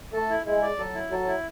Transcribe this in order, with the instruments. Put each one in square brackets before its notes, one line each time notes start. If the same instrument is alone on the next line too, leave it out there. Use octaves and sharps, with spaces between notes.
[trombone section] A3 [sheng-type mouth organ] A4
[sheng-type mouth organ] E4
[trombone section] G#3 [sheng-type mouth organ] E4
[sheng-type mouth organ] D5
[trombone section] F#3 [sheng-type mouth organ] A4
[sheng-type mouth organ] E4
[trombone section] F#3 [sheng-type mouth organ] A4
[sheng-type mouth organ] E4